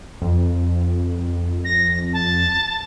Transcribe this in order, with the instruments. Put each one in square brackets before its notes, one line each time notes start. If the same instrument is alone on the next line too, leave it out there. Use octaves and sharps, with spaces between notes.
[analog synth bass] F2
[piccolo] A#6
A5